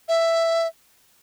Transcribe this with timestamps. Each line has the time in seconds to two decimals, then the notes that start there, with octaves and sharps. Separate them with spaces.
0.08 E5